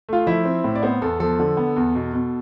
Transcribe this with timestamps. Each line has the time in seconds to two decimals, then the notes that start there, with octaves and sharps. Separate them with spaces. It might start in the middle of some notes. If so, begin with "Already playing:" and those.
0.09 A3 F4 F5
0.27 F3 E4 E5
0.45 C4
0.64 A2
0.76 D5
0.82 B3 C4 C5
1.02 E2 A4
1.20 F3 A4
1.39 D3
1.57 B3
1.76 E2
1.95 B2
2.13 B2